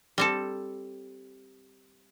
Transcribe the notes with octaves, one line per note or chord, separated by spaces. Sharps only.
G3 C4 A4